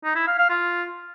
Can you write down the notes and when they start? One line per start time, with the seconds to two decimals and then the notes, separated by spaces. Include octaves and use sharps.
0.04 D#4
0.16 E4
0.27 F5
0.38 F5
0.50 F4